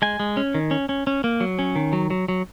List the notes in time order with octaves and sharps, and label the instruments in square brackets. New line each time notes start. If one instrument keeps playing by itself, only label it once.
[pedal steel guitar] G#3 G#5
G#3
C#4
D#3
C#4
C#4
C#4
A#3
F#3
C#4
D#3
F#3
F#3
F#3